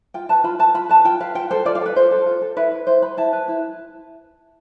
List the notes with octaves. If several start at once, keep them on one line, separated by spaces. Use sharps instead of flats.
F4 G5
B4 A5
F4 B5
B4 A5
F4 B5
B4 A5
F4 G5
B4 F5
F4 G5
A4 C5
F4 D5
F5
A4 B4
F4 C5
A4
F4
A4
E4 B4
B4
E4 C5
B4 B5
E4 A5
B4
E4